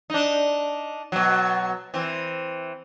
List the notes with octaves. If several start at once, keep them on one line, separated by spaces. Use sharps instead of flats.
D4 D#4
B2 F#3
E3 C4